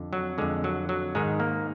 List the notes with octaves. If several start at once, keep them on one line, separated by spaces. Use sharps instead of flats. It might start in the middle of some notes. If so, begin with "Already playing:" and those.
Already playing: F2 D3
F#3
F2 D3 G#3
F#3
F#3
G#2 D#3 G#3
A#3